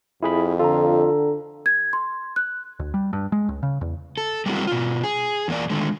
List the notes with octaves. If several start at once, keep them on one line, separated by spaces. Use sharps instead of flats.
F2 E4 G#4 B5
D3 F4 A4 A#5
G#6
C6
F#6
D2
G3
G2
G#3
C#2
C#3
E2
A4
G3 G#3 A#3 C4 E4 F#4
B2 F4
G#4
E2 A#3 D5
D3 D#3 G#3 A3